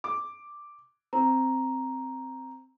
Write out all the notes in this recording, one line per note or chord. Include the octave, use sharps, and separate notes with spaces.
D6
C4 A#5